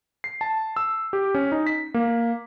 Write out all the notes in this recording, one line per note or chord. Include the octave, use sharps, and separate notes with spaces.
C7
A5
E6
G4
C#4
D#4
B6
A#3